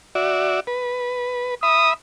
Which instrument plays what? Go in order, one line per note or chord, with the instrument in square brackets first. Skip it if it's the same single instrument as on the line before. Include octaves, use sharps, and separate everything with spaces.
[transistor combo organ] F#4 D5 E5
B4
[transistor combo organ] E5 B5 [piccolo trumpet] D#6